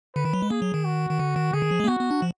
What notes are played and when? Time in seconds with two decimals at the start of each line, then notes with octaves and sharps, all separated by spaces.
0.15 D3 B4
0.25 D#3
0.33 F#3
0.42 G#3
0.50 A#3 G#4
0.62 F#3
0.74 D#3
0.85 F#4
1.11 D#3
1.19 D3
1.36 D#3
1.54 D3 G#4
1.62 D#3
1.71 F3
1.80 G#3
1.84 A#3
1.88 B3 F#4
2.00 B3
2.11 D4
2.22 F3